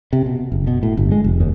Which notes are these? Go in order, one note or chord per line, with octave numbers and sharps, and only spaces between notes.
C3
B2
F#1
B2
A2
G1
G#3
F1
D#2